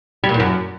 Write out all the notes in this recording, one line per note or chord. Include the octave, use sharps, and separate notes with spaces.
G3
A#2
E2
F#2